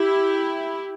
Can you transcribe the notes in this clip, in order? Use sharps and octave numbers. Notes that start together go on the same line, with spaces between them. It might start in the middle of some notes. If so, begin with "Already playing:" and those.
Already playing: E4 G4